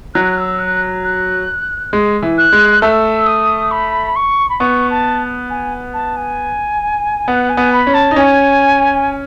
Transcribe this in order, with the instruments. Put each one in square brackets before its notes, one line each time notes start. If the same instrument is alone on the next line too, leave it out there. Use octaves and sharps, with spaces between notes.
[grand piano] F#3 [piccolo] F#6
[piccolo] E6
F#6
F#6
[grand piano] G#3
E3
[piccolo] F#6
[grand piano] G#3
[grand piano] A3 [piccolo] E6
[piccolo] D#6
B5
C#6
B5
[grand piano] B3 [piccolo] C#6
[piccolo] A5
G#5
A5
G#5
[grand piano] B3 [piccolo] F#5
[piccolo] G#5
[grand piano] B3
[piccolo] B5
[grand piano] C#4
[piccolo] A5
[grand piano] D#4
[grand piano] C#4 [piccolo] G#5